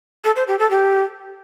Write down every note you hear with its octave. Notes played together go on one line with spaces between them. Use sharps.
A4
C5
G4
A4
G4